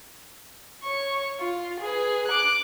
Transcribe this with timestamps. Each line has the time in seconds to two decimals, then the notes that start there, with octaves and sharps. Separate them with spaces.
0.83 C#5 C#6
1.39 F4
1.80 G#4 B4
2.27 D6 F#6